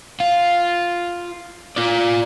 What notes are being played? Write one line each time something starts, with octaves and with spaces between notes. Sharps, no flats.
F4
F4 D5